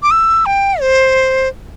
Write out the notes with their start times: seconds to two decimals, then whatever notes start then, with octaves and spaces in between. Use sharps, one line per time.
0.03 D6
0.11 E6
0.46 G5
0.81 C5